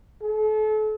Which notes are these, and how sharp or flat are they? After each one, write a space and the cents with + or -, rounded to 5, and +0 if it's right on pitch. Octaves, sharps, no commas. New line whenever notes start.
A4 -35